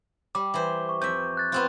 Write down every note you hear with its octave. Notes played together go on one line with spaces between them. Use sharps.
G3 D6
E3 C5
C#6
F2 E5 G6
F#6 A6
B3 C4 F4